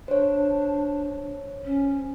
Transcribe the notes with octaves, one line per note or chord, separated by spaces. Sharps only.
D4 C5 C#5
C#4